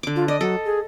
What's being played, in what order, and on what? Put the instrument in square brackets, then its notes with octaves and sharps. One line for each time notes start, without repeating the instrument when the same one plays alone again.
[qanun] D3 D6
[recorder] F4
[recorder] D5 [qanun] D#5
[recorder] F#3 [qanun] A4
[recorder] G#4